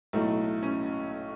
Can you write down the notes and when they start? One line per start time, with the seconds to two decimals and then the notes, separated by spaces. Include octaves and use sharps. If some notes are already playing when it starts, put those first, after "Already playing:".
0.13 B1 A2 F#3 A3
0.63 C#4